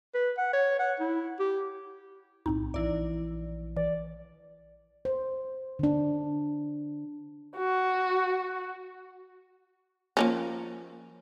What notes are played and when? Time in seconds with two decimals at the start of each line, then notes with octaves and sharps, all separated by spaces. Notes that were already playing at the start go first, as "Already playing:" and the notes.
0.14 B4
0.37 F#5
0.53 C#5
0.79 F#5
1.00 E4
1.39 G4
2.46 B1 A2 C4 D#4
2.74 A#1 E3 E4 D5
3.76 E3 D5
5.05 C5
5.79 D3 D4
7.56 F#4
10.17 F3 A#3 C#4